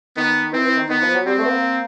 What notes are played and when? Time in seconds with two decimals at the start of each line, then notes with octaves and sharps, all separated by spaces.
0.17 D#3 B3
0.53 E3 C4
0.65 E3
0.77 D#3
0.89 D#3 B3
1.02 F3
1.14 F#3
1.26 G3 C4
1.38 A3
1.45 B3
1.50 A#3